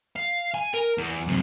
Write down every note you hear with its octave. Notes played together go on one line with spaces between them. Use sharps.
F5
G#5
A#4
E2
F#2 C3